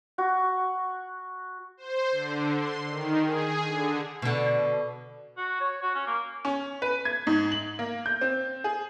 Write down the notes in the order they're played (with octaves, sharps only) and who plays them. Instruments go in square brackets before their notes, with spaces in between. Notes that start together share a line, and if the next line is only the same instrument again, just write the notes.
[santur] F#4
[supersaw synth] C5
D3
C6
D#3
G#4
D3
[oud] B2 D3
[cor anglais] F#4
C#5
F#4
C#4
A#3
[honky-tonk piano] C#4
B4
G#6
G#2
F#7
A#3
G6
C4
G#4